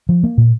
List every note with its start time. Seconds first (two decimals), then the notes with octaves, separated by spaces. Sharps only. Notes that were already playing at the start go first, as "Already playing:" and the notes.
0.09 F3
0.23 A#3
0.38 A#2